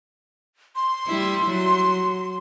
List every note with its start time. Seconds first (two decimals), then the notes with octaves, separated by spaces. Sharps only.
0.76 C6
1.07 G3 E4
1.49 F#3